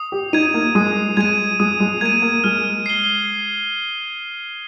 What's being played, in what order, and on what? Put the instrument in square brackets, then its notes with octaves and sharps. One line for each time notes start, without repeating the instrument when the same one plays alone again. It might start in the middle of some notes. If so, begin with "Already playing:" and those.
Already playing: [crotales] D#6
[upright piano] G4
[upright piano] D#4 [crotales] G#6 D#7
[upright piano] A#3
[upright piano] G#3 [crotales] D#6
[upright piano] G#3 [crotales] G#6 D#7
[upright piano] G#3 [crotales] D#6
[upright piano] G#3
[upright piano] A#3 [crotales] G#6
[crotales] D#7
[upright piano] A#3
[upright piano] G#3 [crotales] F6
[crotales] C7 G7